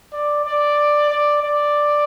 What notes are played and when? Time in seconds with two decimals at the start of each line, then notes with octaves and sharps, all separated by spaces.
0.13 D5
0.45 D5
1.09 D5
1.42 D5